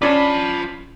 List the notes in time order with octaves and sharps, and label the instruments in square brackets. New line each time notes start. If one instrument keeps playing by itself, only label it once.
[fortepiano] C#4 D4 D5 [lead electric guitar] F4 A5 [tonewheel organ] B5